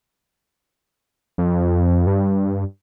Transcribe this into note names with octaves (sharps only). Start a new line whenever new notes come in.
F2
G2